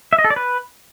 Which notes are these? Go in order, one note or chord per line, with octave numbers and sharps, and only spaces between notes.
E5
D#5
A4
D5
B4